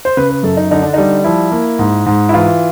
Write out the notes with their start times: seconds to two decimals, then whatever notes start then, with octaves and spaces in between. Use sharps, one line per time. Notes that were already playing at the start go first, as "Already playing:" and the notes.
0.05 C5
0.17 C#3 B4
0.30 B4
0.43 F#2 A4
0.57 D#4
0.71 D3 D#4
0.82 D4
0.93 G3 D#4
1.24 F3 E4
1.52 A#3
1.79 G#2
2.06 G#2
2.29 E4
2.34 E3 F4